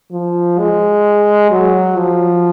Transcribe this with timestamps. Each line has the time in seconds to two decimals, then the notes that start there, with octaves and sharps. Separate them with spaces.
0.12 F3
0.59 G#3
1.51 F#3
1.98 F3